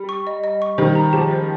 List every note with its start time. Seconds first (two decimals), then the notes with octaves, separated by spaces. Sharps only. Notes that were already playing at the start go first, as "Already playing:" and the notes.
Already playing: G3
0.09 C#6
0.27 D#5
0.44 D#5
0.62 C#6
0.78 D#3 G3 C5
0.95 A#5
1.13 F3 G#3 G4
1.31 C5